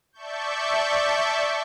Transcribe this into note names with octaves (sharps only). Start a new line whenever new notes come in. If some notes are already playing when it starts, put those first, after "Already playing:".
D5 E5 A5 C#6 G6